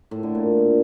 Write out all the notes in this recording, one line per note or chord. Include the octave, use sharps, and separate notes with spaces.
A2
D3
A#2